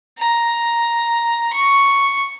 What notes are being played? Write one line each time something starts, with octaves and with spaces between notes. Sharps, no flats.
A#5
C#6